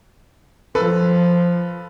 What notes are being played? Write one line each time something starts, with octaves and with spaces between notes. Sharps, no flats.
F3 A4 B4